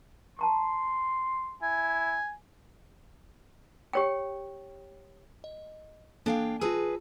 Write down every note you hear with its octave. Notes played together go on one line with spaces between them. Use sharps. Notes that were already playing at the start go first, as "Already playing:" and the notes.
A5 A#5 C6 C#6
E4 G#5
G4 C#5 G5
D#5
A#3 D4 A4 F5 G5 G#5
F4 G#4 B4 A5 E6